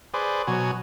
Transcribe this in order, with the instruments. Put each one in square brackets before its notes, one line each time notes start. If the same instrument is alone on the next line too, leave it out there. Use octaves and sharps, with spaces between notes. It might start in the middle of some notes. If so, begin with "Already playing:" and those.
[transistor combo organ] G#4 B4 C5 D5
B2 F#3 G#5